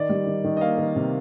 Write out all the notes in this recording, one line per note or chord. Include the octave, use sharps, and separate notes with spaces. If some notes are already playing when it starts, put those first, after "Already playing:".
Already playing: D#3 D5
G3
D#3
D#3
D#5
A#3 F5
D#3
C3